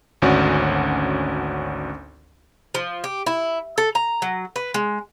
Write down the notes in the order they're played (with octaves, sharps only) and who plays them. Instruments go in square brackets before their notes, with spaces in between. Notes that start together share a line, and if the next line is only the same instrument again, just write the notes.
[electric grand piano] G#1 D2 C#4 D4 F#4
[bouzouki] F3
G4
E4
A4
A#5
F#3
B4
G#3